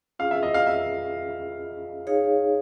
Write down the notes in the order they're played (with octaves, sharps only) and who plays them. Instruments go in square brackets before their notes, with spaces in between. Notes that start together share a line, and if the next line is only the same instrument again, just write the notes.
[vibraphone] C#4 F4 G#4 [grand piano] F5
[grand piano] E5
D#5
F5
E5
[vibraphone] D#4 G#4 C#5 F5